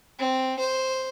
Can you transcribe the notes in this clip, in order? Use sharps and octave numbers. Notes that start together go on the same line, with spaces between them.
C4
C5